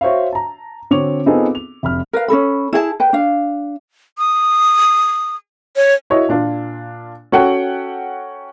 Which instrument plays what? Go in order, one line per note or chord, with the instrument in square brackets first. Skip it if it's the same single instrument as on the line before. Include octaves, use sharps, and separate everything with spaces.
[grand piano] F#4 C5 C#5 E5 F5
A5 A#5
D3 C4 F#4 C#5 D6 F7
B3 C4 D#4 F4 G#4 A4
F7
F1 B5 F6
[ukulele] A#4 B4 F5
C#4 D#4 A4 B5
E4 G#4 A4 A5
B4 G5
D4 F5
[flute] D#6
C#5
[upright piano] E4 F#4 C#5 D#5
A#2 D4 F4
C#4 F#4 A4 F#5 G5